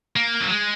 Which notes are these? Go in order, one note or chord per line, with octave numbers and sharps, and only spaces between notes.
A#3
F#3
G#3